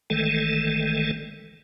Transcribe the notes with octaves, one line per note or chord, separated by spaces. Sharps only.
G1 D#3 E3 G#3 A3 A4